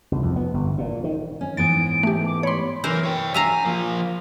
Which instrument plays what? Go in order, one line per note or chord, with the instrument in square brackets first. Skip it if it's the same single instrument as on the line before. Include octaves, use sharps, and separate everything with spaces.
[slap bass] C2
F2
B3
G1
A#2
D#3
[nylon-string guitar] C#4
[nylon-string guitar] G#2 E3 B3 [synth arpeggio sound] A6 [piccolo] D7
[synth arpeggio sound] A3 G4
[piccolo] D6
[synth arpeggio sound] C#5 C6 [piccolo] B5
[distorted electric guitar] B1 A#4 [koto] E3 C5
[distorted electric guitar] C#5 G5
[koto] E5 F5 A#5 [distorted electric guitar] G#5
[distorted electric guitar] F3 A#3